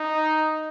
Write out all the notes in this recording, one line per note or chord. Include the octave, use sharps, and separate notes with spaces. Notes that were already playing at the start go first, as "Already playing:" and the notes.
Already playing: D#4